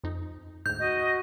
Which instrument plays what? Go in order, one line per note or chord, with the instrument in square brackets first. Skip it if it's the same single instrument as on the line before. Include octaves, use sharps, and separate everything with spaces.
[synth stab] F2 D#4
[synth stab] D2 G#2 [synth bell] G6
[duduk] F#4 [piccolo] D#5